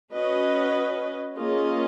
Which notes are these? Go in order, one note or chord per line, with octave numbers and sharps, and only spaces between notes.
C#4 F#4 B4 D#5
A#3 C#4 F4 G#4 D#5